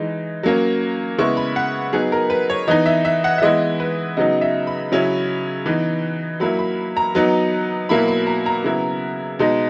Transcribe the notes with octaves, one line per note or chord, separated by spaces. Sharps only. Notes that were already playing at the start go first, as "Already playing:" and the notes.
Already playing: E3 G#3 D#4
F#3 A#3 C#4
C#3 G#3 B3 E4 C#6
B5
F#5
F#3 B3 D#4 G#4
A#4
B4
C#5
E3 B3 D#4 D#5
E5
E5
F#5
E5
E3 G#3 B3 E4 D#5
B4
C#3 F#3 B3 D#4 D#5
E5
B5
C#3 F#3 C#4 E4
E3 B3 D#4
F#3 A#3 E4 B5
B5
A#5
F#3 B3 D#4
B2 F#3 A#3 E4 B5
B5
A#5
A#5
C#3 F#3 B3 E4
B2 G#3 D#4